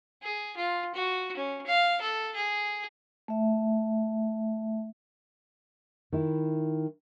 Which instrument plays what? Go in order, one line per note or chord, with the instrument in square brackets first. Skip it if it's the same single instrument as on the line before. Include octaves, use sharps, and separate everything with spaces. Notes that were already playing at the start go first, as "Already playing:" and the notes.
[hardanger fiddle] G#4
F4
F#4
C#4
F5
A4
G#4
[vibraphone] A3 E5
[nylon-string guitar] D#3 E4